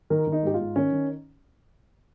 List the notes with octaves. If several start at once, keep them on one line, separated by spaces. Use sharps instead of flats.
D#3 A#4
D#3
D#4
G#2 G4
G#2 F4
D#3 C#4
D#3